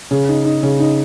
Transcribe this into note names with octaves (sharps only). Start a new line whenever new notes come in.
C#3
D#4
D#4
C#3
D#4